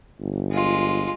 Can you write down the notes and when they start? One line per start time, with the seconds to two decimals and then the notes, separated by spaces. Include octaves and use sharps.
0.20 G1
0.51 G#3 F4